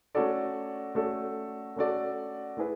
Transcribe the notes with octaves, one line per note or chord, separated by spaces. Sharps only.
A3 C#4 F#4 A4 D5
A3 C#4 F#4 A4 D5
A3 C#4 F#4 A4 D5
A3 E4 G#4 B4